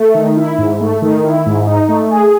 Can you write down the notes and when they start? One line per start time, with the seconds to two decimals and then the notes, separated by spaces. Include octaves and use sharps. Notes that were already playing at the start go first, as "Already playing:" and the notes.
Already playing: A3
0.15 D#3
0.37 E4
0.58 G#2
0.81 A3
1.02 D#3
1.24 E4
1.46 G#2
1.67 D#4
1.89 A3
2.11 G#4